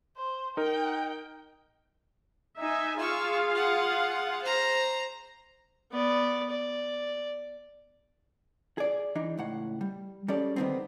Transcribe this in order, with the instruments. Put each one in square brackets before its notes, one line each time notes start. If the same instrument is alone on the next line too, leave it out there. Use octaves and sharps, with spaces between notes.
[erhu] C5
[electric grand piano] D#4 A#4 [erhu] G5
[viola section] D#4 E5 G#5
[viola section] F4 G#4 F5 [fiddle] C#6 E6
[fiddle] F#5
C5 A#5
[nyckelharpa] B3 D5
D5
[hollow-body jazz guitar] G#4 D5
E3 D4 D#4
C#2 A2 F#5
G3
G3 C#4 G#4 A4 D5
D3 D#3 F3 F#3 B3 C4